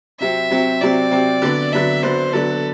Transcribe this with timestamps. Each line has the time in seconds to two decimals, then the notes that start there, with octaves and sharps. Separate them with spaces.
0.20 C3 F#3 C4 E5
0.50 C3 F#3 C4
0.82 C3 F#3 C4 D5
1.11 C3 F#3 C4
1.42 D3 F#3 B3 D4
1.73 D3 F#3 B3 D4 E5
2.03 D3 F#3 B3 D4 C5
2.33 D3 F#3 B3 D4 A4